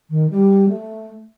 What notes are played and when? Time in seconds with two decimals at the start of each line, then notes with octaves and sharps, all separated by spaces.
0.10 D#3
0.30 G3
0.69 A3